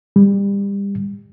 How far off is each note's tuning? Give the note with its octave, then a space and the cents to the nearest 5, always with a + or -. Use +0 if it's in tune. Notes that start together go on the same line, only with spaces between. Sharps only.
G3 +30